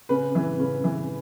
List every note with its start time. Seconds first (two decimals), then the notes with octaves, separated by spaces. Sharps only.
0.09 C#3 B4
0.35 E3
0.59 C#3
0.84 E3